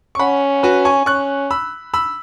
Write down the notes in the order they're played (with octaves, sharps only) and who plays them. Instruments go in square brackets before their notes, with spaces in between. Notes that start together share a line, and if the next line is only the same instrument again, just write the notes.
[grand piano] C#6
[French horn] C#4 [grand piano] F#5 B5
[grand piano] F#4 B4
G#5 C#6
[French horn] C#4 [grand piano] C#6 F#6
[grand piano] B5 E6
B5 E6